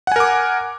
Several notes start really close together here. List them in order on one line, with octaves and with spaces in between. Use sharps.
F#5 G#5 A#4 D6